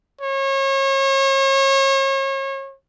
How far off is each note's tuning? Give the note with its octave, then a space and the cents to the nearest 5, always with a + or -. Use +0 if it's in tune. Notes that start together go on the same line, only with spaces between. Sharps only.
C#5 -35